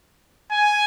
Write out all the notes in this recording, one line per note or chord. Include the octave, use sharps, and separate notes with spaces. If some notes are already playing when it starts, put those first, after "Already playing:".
G#5